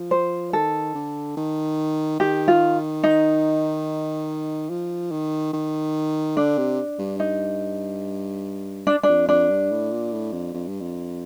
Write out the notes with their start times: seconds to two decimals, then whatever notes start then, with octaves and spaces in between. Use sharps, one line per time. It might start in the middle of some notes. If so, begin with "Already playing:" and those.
Already playing: F3
0.11 C5
0.53 D#3 A4
0.95 D3
1.37 D#3
2.20 D#3 G4
2.48 F4
3.04 D#4
4.70 F3
5.11 D#3
5.53 D#3
6.37 D3 D4
6.58 C3
6.99 G2
7.20 D#4
8.87 D4
9.03 F2 D4
9.28 F2 D4
9.50 G2
9.71 A2
9.92 A#2
10.12 A2
10.32 F2
10.54 F2
10.67 G2
10.81 F2